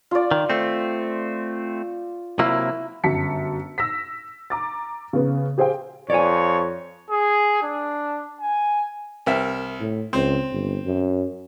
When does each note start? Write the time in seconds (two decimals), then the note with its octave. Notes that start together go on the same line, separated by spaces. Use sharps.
0.11 F4 D5
0.31 D#3
0.50 A3 C4
2.39 C3 F#3 A#3 E4
3.04 G1 F#2 A5 B6 C#7
3.78 E6 A#6 B6
4.50 A#5 D6 A6
5.13 C#3 B3
5.58 G4 G#4 C5 F5 G5
6.10 F2 C#5 D5 G#5
7.10 G#4
7.63 D4
8.41 G#5
9.26 C2 A#4 E5
9.80 A2
10.13 C#2 C4
10.52 G1
10.86 F#2